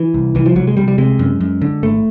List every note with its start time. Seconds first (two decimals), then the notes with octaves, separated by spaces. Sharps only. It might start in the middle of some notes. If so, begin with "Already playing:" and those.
Already playing: E3
0.14 C2
0.35 C2 E3
0.46 F3
0.56 C2 F#3
0.67 G#3
0.77 C2 G3
0.88 G3
0.98 C3 G#3
1.19 F#2
1.41 F#2
1.62 D3
1.83 G#1 A3